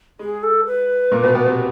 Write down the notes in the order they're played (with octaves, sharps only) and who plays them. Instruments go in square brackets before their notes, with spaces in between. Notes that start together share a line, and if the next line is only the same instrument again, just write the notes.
[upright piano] G#3 [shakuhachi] G#4
[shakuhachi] A4
B4
[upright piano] A#2 A#3
B2 B3
B2 B3
C3 C4